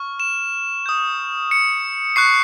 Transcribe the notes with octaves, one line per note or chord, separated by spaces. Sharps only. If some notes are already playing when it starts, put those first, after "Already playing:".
Already playing: C#6 F6
E7
D#6 G6
C#7
C#6 F#6 C7